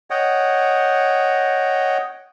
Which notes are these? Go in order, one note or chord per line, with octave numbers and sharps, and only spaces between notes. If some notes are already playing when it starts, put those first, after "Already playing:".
C#5 D#5 F#5 G5